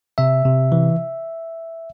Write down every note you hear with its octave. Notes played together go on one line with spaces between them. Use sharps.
C3 E5
C3
E3